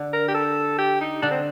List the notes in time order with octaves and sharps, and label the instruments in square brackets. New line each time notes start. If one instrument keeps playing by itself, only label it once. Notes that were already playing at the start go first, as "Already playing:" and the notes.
Already playing: [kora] D3
[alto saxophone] A#4
G4
A4
G4
D#4
[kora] D3 [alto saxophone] D4
[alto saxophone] C4